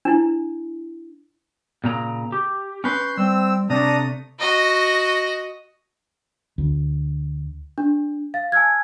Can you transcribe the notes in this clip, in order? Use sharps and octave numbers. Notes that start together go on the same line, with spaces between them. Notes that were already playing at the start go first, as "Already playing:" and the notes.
D4 E4
A#2 C#3 A#5
G4
C#4 B4 C6 G6
G3 C4 E6
C3 A3 D4 A#5 D#6
F#4 D#5
D2
D4
F5 A6
G#5 A5 E6 F6 G#6